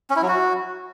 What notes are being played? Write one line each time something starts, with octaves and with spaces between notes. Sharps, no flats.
C#4
E4
F#3
F#4